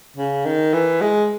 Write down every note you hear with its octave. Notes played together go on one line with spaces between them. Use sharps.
C#3
D#3
E3
G#3